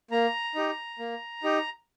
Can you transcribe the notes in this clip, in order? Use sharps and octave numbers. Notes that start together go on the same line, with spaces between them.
A#3 A#5
D#4 G4
A#3
D#4 G4